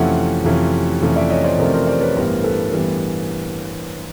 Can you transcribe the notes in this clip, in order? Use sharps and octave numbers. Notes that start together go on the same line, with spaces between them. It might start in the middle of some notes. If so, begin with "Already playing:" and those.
Already playing: F2 C3 E3 A3 C#4 E5 F#5
F2 C3 E3 A3 C#4
F2 C3 E3 A3 C#4
D5 E5
C#5 D#5
C5 D5
F2 C3 E3 A3 C#4 A#4 C5
A#4 C5
C5 D5
B4 C#5
A1 G2 E3 G3 B3 A#4 C5
A4 B4
E3 G3 B3 A4 B4